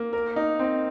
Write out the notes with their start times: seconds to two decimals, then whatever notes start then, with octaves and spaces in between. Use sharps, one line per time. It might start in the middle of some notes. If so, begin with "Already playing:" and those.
Already playing: A#3
0.13 A#4
0.36 D#4
0.59 C4